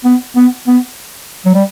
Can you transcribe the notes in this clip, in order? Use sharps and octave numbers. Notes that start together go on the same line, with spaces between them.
B3
B3
B3
F#3
G3